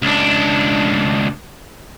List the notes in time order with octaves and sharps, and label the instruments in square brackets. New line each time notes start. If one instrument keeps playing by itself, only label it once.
[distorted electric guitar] C#2 D4